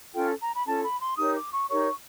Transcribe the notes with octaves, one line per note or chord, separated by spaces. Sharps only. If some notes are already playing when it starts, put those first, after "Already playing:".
C#4 F4 A4 G5
A#5
B5
C#4 F4 A4 A5
B5
C6
D#4 G4 A#4 C#5 D#6
D6
C#6
D#4 G4 A#4 C#5 C#6